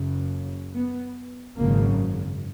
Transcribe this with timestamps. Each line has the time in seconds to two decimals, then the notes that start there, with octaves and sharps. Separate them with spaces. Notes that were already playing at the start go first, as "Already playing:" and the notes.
Already playing: F#1 F#2 C#3
0.73 B3
1.57 G#1 F#2 C#3 A#3